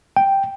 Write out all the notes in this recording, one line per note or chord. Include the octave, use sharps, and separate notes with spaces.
G5